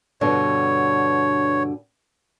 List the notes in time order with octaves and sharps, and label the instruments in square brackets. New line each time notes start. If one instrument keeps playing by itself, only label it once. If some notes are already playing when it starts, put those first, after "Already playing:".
[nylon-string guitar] G2 B2 D3 [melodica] C#5